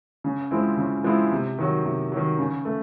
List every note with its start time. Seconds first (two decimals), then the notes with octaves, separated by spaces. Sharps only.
0.24 C#3
0.51 F3 G#3 C4 E4
0.77 C#3
1.04 F3 G#3 C4 E4
1.32 C3
1.58 D#3 F#3
1.86 C3
2.12 D#3 F#3
2.38 C#3
2.65 A3